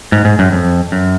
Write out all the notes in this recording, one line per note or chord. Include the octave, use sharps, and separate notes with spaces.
G#2
G#2
F#2
F2
F#2